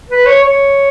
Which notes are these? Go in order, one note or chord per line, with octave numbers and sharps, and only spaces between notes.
B4
C#5
C#5